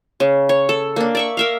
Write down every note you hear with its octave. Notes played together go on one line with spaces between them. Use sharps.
C#3
C#5
A4
A#3 D4
D5 E5 C#6
A#4 E5 F5